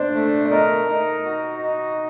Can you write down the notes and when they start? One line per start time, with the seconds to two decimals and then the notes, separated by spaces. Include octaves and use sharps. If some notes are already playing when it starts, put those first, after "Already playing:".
Already playing: D4 C5 D5
0.14 A3
0.45 D5
0.50 A#4 D#5
0.88 D#4
1.25 F#4
1.63 D#4